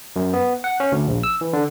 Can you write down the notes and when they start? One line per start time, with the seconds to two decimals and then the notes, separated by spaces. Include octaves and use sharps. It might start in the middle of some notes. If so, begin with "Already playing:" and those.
0.16 F#2
0.33 B3
0.64 F#5
0.80 C#4
0.92 D2
1.07 A#1
1.23 E6
1.41 E3
1.53 D3